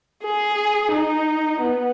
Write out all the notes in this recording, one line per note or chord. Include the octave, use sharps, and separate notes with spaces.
G#4
D#4
B3